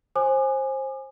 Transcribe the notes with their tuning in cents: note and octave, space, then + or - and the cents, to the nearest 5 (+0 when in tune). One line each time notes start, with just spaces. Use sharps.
C5 +25 G#5 +0 D6 +45